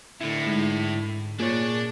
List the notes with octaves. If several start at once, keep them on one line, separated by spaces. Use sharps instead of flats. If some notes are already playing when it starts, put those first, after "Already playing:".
A2 D3 E4
G#2
A#2 D4 G#4 C#5 D5